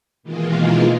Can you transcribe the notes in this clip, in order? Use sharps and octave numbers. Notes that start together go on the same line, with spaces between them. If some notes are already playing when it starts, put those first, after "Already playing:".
B2 D#3 E3 G#3 A#3 F4